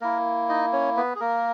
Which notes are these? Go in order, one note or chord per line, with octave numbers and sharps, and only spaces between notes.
A#3 E4 A#4
D#4 D#5
C#4 C#5
B3 B4
G#4
A#3 A#4